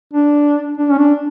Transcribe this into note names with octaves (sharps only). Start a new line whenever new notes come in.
D4
D4
C#4
D4